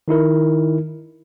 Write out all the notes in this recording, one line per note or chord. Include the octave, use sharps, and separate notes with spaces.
D#3 D#4 E4 A#4